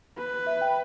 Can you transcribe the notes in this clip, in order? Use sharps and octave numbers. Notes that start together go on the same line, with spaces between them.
B4
E5
G5